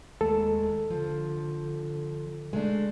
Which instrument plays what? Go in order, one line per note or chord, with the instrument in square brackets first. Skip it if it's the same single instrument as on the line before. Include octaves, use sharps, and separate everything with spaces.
[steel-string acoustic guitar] D#2 G#3 A3 [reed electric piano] A4
[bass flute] D3 [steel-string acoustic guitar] F3
[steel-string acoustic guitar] G#3 A3 D4